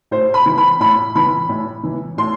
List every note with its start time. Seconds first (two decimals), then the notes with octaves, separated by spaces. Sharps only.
0.11 A2 C5
0.34 B5
0.46 E3
0.58 B5
0.80 A2 B5
1.15 E3 B5
1.49 A2
1.83 E3
2.18 A2 C6